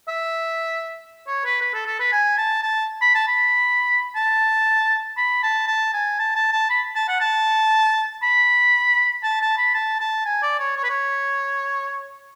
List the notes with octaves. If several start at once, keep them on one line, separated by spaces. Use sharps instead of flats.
E5
C#5
B4
B4
A4
A4
B4
G#5
A5
A5
B5
A5
B5
A5
B5
A5
A5
G#5
A5
A5
A5
B5
A5
F#5
A5
B5
A5
A5
B5
A5
A5
G#5
D5
C#5
C#5
B4
C#5